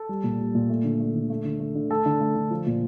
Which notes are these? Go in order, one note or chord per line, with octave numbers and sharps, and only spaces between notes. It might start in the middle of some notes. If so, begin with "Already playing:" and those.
Already playing: A4
G3
A#2
G3
A#2
A3
D3
A3
D3
A3
D3
A3
D3
A3 A4
D3
A3
D3
F3
A#2